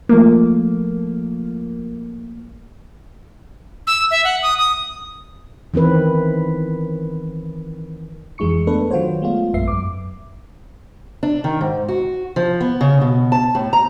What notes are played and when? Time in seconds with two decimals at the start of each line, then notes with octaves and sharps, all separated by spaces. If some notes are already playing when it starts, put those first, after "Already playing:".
0.09 F3 A3 A#3
3.87 E6
4.11 E5
4.24 F#5
4.42 D#6
4.59 D#6
5.74 D#3 E3 C4 B4
8.38 F2 E3 G#3 D#4 C#6 C#7
8.67 A3 B3 D4 A4 B4
8.91 D#3 F#3 F4 F#4 C5 C#5
9.22 G#3 A3 B3 F4
9.54 A#1 F#2 B3 E5 C7
9.68 F#2 D6
11.23 D4
11.44 D#3
11.61 G#2
11.88 F#4
12.36 F3
12.61 B3
12.81 C#3
13.01 B2
13.32 A5
13.55 A2
13.73 A#5